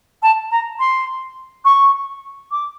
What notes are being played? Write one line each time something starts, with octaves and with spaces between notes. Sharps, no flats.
A5
A#5
C6
C#6
D6